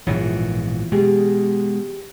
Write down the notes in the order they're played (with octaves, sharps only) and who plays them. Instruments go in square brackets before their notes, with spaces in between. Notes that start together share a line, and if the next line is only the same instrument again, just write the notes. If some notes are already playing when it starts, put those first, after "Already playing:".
[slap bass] A#1 G#2 B2 [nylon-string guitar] E3 F4 C#5
[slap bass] B2 G#3 [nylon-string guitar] G4 G#4